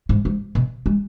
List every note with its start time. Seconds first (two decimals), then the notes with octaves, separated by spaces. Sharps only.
0.09 G#2
0.25 G#2
0.55 B2
0.86 G#3